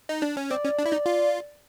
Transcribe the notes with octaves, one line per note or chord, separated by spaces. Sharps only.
D#4
D4
C#4
C4 D5
C#4
D4
E4
D#4
F4